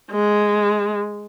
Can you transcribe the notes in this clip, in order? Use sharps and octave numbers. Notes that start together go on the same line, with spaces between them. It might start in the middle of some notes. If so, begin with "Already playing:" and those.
G#3